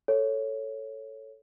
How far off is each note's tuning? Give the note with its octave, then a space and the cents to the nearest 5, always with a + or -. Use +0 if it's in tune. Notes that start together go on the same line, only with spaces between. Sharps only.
A4 +0 C#5 +0